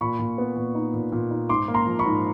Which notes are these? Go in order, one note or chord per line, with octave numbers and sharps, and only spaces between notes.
A#2 B5 C#6
A#2
B3
A#2
D#4
A#2
A#2
D#4
G#2 C6 D6
A#3
A#5 C6
F3
B5 C#6
G#2